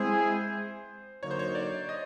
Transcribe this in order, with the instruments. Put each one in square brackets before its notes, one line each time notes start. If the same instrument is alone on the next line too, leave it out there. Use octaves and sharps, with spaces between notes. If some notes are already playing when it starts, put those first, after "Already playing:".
Already playing: [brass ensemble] G#3 C4 E4 G#4 [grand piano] C5
[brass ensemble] D3 F#3 A#3 D#4 [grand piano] C#5
[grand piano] C5
C#5
D5
D#5